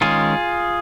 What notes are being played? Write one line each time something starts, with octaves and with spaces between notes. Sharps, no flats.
D#3 G#3 C#4 F4 G#4